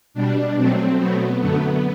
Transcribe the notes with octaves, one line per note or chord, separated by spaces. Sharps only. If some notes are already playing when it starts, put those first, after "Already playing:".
B2 G3 D4
B2 F#3 A3 C4
B2 F#3 A3 B3
F#2 D3 F#3 A3